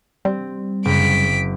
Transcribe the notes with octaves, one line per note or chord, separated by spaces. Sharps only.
G3 C4
F#1 B6 D7